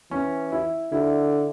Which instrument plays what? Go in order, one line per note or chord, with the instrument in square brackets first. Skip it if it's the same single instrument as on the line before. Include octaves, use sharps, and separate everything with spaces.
[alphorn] E3 [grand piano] C#4
[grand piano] E4
[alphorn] D3 [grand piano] E4